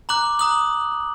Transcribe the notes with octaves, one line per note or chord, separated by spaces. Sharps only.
A#5 D6 F#6 F#7
A#5 D#6 F#6 F#7